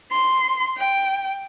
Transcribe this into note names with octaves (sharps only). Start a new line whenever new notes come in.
C6
G5